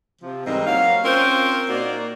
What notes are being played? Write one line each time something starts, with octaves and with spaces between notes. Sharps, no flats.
C3 F3
G#2 E3 G3 C4 A#4 D#5
F#3 A#3 C#5 F5
C4 C#4 F4 A#4 C5
A#2 A#3 D#4 F#4 D5